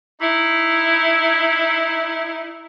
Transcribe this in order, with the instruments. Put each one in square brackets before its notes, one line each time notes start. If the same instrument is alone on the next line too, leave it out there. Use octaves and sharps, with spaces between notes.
[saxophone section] D#4 E4